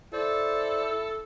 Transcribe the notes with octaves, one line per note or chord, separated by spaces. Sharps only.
E4 A4 C5 D5